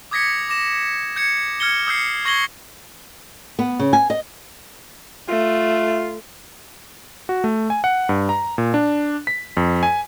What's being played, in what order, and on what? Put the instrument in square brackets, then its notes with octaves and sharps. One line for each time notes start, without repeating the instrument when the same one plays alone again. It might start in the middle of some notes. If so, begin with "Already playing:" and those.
[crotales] D6 D#6 G#6 A#6 B6 C#7
D6 A#6 E7
G6 G#6 C#7
F6 G#6 C#7 G7
D#6 E6 G6 C7 C#7
C#6 G#6 A#6 C7 F#7 G7
[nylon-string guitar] B3
C#3
G#5
D#5
[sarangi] A3 [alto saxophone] F4
[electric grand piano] F#4
A3
G#5
F#5
G2
A#5
A#2
D4
B6
F2
G#5